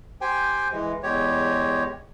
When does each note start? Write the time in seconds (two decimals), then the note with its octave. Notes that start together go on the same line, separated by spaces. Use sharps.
0.21 G4 C5 G5 G#5
0.72 E3 G#3
1.03 E2 G#3 G4 C#5